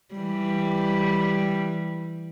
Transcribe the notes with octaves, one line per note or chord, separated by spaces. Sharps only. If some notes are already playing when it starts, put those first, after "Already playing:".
E3 G3